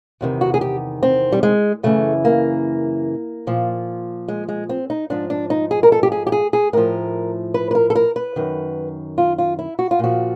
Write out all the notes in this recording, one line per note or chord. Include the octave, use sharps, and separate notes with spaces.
E2 C3 D#3
F#4
G#4
G4
C4
G3
G#3
F#2 C#3 E3 A3
A#3
A#2 F3
G#3
G#3
C4
D#4
G#2 F3 D4
D4
D#4
G#4
A#4
A4
G4
G#4
G4
G#4
G#4
A2 F3 A#4
B4
B4
A#4
A4
A#4
B4
F#2 D#3
F4
F4
E4
F#4
F4
A#2 F3 F#4